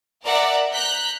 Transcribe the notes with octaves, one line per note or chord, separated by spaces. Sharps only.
A#4 D5 E5 F#5 A#5
A#5 F#6 G6 B6